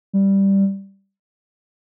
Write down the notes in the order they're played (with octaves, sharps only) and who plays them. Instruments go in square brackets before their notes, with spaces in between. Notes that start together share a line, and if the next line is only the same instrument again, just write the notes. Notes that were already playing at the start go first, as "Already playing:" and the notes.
[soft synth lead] G3